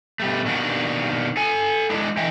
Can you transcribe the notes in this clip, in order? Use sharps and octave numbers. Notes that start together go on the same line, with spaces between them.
B2 G3 A3
B2 D#3 G3 A#3 D4 F#4
A4 G#5
G#3 D4 E4
D3 E3 D#5 E5 G5